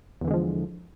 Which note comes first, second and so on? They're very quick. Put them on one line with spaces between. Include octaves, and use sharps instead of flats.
E2 E3 D3 G#3 F3